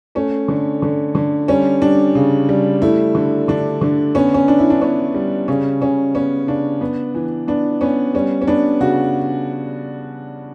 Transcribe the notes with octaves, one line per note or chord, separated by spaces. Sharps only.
A3 C#4
D3
D3
D3
G3 C#4
G3 D4
C#3
G3
A3 E4
D3
D3 D4
D3
B3 C#4
C#4
B3 D4
E4
D4
B3 C#4
G3
C#3 C#4
C#3 C#4
B3 C#4
C#3 D4
B3
E3
B3 D4
B3 C#4
G3 C#4
C#4
B3 D4
C#3 F#4